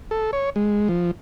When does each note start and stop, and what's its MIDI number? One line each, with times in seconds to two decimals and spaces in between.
0.11 0.31 69
0.33 0.50 73
0.56 0.88 56
0.88 1.11 53